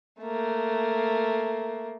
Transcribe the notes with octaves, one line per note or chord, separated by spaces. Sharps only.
A3 A#3